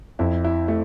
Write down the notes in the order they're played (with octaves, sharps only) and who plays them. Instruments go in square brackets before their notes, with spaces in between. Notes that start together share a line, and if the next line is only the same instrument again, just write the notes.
[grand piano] F2 [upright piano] E4
[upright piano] E4
A3